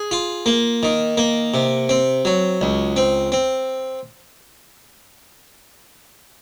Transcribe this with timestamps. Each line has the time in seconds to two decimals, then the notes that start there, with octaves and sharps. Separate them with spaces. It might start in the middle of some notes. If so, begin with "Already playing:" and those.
Already playing: G#4
0.11 F4
0.46 A#3
0.83 D#3
1.17 A#3
1.54 C3
1.89 C4
2.25 F#3
2.61 C#2
2.96 C4
3.32 C4